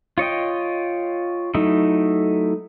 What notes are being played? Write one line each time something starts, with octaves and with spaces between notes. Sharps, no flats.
F4 C#5 D#5 G5
F#3 A3 D#4 E4